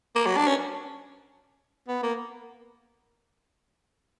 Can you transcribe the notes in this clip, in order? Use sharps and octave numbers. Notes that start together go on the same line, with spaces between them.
A#3
F#3
D4
C#4
B3
A#3